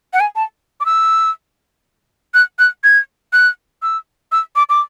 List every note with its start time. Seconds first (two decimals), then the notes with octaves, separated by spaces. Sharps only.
0.13 F#5
0.20 G#5
0.36 A5
0.80 D6
0.86 E6
2.34 F#6
2.59 F#6
2.84 G#6
3.33 F#6
3.82 E6
4.32 E6
4.56 D6
4.69 D6